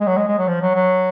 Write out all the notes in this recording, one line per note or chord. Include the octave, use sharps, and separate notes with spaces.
G#3
F#3
G#3
G#3
F#3
F3
F#3
F#3